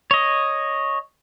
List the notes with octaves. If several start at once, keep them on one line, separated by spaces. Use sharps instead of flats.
C#5 D#5